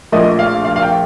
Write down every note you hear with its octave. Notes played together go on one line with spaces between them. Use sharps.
A#1 A#2 F3 A3 D#5
F5
F5
F5
G5